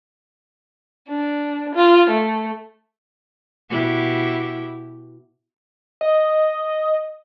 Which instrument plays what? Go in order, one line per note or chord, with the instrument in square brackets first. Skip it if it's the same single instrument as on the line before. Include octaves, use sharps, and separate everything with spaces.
[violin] D4
F4
A3
[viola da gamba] B2 E4 G4
[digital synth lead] D#5